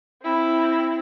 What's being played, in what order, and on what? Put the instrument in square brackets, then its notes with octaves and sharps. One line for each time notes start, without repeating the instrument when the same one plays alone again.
[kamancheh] C4 E4